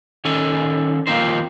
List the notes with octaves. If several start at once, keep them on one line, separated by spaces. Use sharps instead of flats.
D#3 C#4 A4 G#5
D#2 F3 A#3 C4 D#4 C5